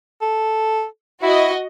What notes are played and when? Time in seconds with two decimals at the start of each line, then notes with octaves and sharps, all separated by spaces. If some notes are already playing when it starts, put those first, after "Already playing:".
0.22 A4
1.23 E4 F#4 D#5